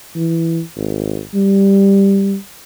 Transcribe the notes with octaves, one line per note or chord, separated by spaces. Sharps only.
E3
G#1
G3